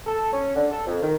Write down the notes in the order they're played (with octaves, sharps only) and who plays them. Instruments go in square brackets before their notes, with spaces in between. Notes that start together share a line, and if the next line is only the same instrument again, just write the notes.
[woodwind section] A4
C#4
D3
A4
F2
D#3